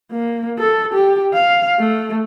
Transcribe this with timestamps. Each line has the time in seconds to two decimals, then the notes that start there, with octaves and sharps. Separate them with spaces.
0.11 A#3
0.59 A4
0.94 G4
1.34 F5
1.80 A3